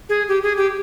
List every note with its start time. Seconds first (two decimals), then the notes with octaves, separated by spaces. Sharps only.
0.09 G#4
0.28 G4
0.43 G#4
0.57 G4